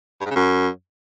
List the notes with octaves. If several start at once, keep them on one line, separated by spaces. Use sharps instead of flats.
G2
G#2
C#3
F#2